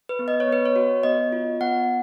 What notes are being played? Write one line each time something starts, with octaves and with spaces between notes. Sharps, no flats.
B4
B3
D#5
C#5
B3
B4
C#5
F#4
B3 D#5
F4
B3 F#5